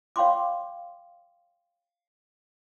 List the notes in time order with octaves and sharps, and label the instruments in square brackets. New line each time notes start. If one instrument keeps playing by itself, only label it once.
[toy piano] C#5 F5 G5 B5 C6 D6